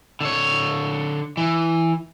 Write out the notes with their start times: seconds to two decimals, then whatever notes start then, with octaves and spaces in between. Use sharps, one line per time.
0.21 D3 C#5
1.37 E3